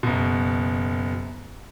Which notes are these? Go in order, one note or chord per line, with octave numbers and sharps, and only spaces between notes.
F#1 B2